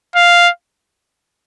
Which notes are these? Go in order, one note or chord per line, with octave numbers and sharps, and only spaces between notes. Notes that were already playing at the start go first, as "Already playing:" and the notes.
F5